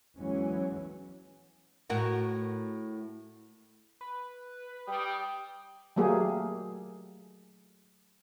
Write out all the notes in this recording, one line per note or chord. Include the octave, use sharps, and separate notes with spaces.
E2 E3 F#3 G#3 C#4
A2 F#4 A#4
B4
G3 G5 D#6
F#3 A3 A#3 G4 G#4